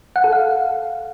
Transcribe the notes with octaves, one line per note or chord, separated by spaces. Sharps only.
F#5
A4
F5